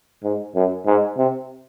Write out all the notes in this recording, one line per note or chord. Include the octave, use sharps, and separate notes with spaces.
G#2
F#2
G#2
C3